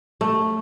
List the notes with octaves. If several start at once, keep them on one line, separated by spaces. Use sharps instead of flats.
A3